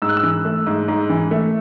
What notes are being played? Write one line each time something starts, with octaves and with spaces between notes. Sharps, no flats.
G#2 E6
F#6
E6
E3
A3
G#2
G#2
E3
A3